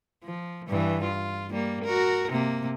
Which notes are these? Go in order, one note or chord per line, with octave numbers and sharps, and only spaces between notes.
F3
G2 E3
F4
G3 A#3
F#4 A#4
C3 A#3